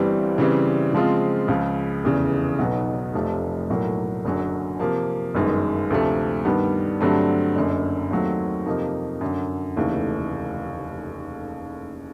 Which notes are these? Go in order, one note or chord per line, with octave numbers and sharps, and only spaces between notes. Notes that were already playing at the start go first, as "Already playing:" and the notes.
Already playing: G1 G2 E3 G3 C4
C#3 E3 G3 C4
C#3 F3 G#3 C4 F4
C#2 C#3 F3
F1 E2 C#3 E3
B1 B2 F#3 B3 D#4
F1 F2 C3 F3 A3
B1 A2 F#3 A#3
F#1 F#2 D3 F#3
C3 F3 A#3
G1 F#2 D#3 G#3
D2 C3 F3 A3
G2 D#3 G3 B3
G2 D3 F#3 A3 C4
F#1 F#2 D3
D#2 D#3 F#3 A3 C4
F2 C3 F3 A#3 D#4
F#2 D3 F#3
F1 D#2 C#3 E3 A3